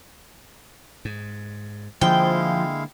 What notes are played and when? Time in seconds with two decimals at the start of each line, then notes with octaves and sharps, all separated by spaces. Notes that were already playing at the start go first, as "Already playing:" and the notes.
1.05 G#2
2.01 D3 F3 G#3 A#3 E4 F5 G5